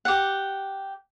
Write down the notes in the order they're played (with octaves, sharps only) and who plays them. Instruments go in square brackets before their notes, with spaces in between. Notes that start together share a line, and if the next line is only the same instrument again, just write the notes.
[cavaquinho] G4 F#5